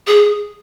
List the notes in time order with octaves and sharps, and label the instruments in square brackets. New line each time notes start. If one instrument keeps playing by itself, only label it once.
[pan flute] G#4